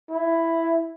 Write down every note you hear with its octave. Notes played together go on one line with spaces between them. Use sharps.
E4